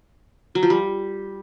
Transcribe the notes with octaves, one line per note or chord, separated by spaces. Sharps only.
F#3
F3
G3